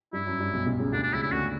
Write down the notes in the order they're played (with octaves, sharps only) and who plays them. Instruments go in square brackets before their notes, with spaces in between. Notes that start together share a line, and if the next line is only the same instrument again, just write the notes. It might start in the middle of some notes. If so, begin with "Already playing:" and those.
[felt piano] G2 [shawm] E4
[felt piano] F#2
G2
B1 B2
B1 B2
C#2 C#3
[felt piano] D2 D3 [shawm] D4
[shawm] D4
[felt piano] C#2 C#3 [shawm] E4
[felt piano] C#3 [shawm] E4
[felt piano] D2 D3 [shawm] F#4